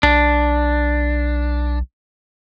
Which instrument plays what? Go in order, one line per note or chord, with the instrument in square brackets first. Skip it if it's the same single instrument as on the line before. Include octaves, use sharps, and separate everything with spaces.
[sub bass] B1 [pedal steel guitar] D4